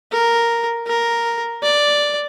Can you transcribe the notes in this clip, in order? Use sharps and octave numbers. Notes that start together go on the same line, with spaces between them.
A#4
A#4
D5